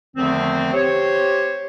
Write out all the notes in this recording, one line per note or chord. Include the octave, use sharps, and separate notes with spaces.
E2 D3 D#3 F3 A3 C4
G4 C5 C#5